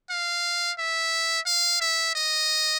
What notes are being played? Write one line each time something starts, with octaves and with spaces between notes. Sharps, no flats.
F5
E5
F5
E5
D#5